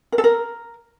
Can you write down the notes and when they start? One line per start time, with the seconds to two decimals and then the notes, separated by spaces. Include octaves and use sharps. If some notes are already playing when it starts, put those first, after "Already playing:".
0.12 A#4
0.18 A4
0.24 A#4